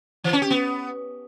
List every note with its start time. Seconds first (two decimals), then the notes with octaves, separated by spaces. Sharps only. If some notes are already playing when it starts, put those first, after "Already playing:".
0.24 E3
0.33 C#4
0.42 G4
0.50 B3